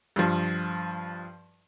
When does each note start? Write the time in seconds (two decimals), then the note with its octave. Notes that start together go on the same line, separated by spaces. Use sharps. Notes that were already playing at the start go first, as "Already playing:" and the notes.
0.16 G2 F3